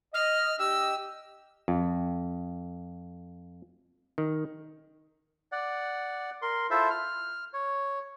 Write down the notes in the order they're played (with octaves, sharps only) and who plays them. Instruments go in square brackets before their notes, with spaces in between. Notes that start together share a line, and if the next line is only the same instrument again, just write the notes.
[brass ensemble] D#5 [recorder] F6
[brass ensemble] D4 G4 D#5 [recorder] E6
[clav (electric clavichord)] F2
D#3
[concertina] D5 F#5
A#4 C6
E4 F4 A4 C5 E5
F6
C#5